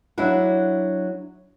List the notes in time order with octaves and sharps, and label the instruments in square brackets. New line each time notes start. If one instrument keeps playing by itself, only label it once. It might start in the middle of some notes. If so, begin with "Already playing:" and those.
[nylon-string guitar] F#3 D4 E4 F#4